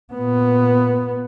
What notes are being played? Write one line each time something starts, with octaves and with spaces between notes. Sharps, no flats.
A#2 B3